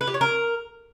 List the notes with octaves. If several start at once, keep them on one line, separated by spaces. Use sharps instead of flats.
B4
G4
C#5
A#4